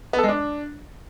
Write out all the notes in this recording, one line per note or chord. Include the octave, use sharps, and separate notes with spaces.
B3
A4
G#3
D4